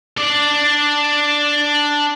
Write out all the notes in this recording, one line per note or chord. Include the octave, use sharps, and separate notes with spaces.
D4 D5